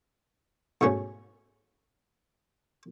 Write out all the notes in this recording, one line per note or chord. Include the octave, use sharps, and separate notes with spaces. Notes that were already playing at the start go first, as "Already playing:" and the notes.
G#2 B2 A3 C#4